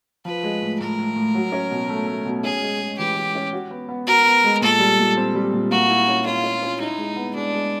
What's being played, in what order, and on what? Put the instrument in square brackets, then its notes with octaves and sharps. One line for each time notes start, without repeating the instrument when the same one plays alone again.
[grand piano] F3 [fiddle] B4
[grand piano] G#3
A2
[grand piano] A2 [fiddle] A#4
[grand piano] A2
A2
F#3
C#4
B2
A3
A3
B2
[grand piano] C#4 [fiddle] G#4
[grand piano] G#3
G#3
[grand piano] E3 [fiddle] G4
[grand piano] E3
C#4
F#4
B3
B3
[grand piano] F#4 [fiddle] A#4
[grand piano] B3
G#3
[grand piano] A#2 [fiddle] A4
[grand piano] G3
A#2
C4
G3
A#2
[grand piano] A#3 [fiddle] F#4
[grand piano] E4
C#4
[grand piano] C#4 [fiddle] F4
[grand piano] C#4
C#4
[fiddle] D#4 [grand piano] E4
[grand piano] G#3
B3
[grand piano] G#3 [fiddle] D4
[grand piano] G#3